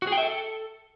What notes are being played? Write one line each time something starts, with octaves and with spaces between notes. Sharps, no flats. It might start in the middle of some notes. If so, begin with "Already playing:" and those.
F#4
G#4
G5
E5
A4